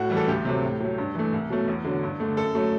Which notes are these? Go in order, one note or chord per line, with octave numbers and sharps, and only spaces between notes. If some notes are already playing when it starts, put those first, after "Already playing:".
Already playing: A2 F#4
E3 G3
A4
D2 G4
C3 F#3 A3
A2
F#3 A3
G2
E3 A3
C2
B2 F#3 A3
E2
D3 F#3
G2
D3 A3
F#2 A4
F#3 A3